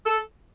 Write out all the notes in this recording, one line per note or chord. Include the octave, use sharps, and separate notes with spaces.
A4